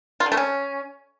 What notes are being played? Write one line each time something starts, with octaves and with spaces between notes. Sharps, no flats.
F4
D3
A3
C#4